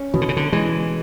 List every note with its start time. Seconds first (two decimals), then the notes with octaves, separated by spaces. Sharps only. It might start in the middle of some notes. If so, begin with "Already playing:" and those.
Already playing: C#4
0.14 B2 E3
0.21 D3
0.29 C#3
0.37 D3
0.52 E3 G#3